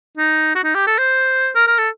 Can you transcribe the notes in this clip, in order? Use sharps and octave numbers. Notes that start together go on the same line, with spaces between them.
D#4
F#4
D#4
G4
A4
C5
A#4
A#4
A4